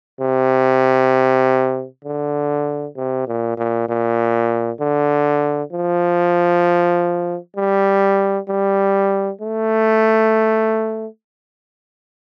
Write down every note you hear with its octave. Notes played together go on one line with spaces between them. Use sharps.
C3
D3
C3
A#2
A#2
A#2
D3
F3
G3
G3
A3